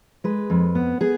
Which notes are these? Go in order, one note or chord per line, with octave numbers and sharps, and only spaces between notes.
G#3 B4
F2
B3
B3 G#4